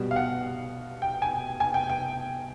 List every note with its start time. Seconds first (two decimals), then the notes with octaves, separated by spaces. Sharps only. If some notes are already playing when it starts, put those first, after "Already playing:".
Already playing: B2 G3
0.11 F5
0.16 F#5
1.02 G5
1.22 G#5
1.60 G#5
1.74 G5
1.90 G5